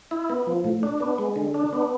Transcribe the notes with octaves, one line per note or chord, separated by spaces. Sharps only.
E4
B3
F3
A2
D4
B3
G#3
D3
D4
B3